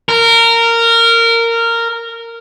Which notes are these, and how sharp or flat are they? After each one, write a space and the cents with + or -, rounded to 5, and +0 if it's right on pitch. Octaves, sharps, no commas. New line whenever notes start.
A#4 -15